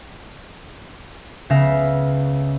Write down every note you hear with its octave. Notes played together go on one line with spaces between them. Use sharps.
C#2 C#3 B3 E5 F5 A#6